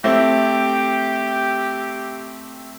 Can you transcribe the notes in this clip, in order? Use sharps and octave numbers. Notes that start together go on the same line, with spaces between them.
A3 C4 E4 G4